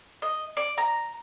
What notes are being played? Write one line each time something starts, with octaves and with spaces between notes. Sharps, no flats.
D#5
D5
A#5